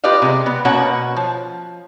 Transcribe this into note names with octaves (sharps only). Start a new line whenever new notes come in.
F4 G4 B4 D5 D#5 F5
C3 G#3
B3
B2 A#3 C#4 C#5 F#5
F3